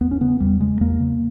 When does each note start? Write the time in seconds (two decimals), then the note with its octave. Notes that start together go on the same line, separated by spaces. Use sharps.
0.01 E2 B3
0.11 C#4
0.21 C#3 B3
0.40 E2 G3
0.60 C#3 G#3
0.81 E2 A#3
1.00 C#3